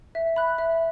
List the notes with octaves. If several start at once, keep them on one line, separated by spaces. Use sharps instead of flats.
E5
B5 F#6
E5